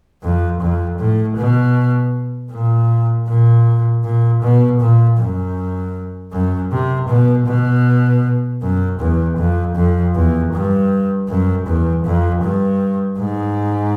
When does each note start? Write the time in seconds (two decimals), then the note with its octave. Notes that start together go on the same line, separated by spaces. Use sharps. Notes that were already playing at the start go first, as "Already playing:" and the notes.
0.23 F2
0.60 F2
0.99 A2
1.37 B2
2.52 A#2
3.28 A#2
4.04 A#2
4.42 B2
4.80 A#2
5.19 F#2
6.32 F#2
6.72 C3
7.09 B2
7.47 B2
8.62 F#2
9.00 E2
9.38 F2
9.76 F2
10.15 E2
10.53 G2
11.28 F#2
11.67 E2
12.05 F2
12.43 G2
13.19 G#2